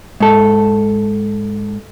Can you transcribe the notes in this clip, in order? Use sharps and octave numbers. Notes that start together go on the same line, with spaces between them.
G#2 A4